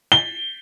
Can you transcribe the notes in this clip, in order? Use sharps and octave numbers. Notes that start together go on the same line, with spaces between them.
G7